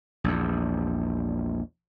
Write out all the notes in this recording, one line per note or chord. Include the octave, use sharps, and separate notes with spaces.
A#1 E2